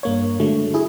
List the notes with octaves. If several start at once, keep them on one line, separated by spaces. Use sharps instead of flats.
G2 A#3 C#5
D3 F#3 G#3 A3
E4 G#4